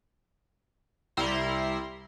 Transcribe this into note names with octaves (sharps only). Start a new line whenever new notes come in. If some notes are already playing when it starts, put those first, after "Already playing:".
C2 G3 E4 A#5 C6